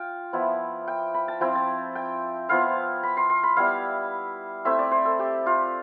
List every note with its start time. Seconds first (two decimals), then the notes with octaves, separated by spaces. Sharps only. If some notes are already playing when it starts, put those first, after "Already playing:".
Already playing: F4 F5 G5
0.33 F3 B3 E4
0.88 G5
1.14 B5
1.28 A5
1.40 F3 C4 E4 G5
1.55 A5
1.95 G5
2.49 F3 B3 E4 F5
3.03 B5
3.17 C6
3.30 C6
3.43 B5
3.56 G3 B3 E4 F5
4.65 A3 C4 E4 E5
4.79 D5
4.91 C5
5.05 A4
5.19 G4
5.46 F4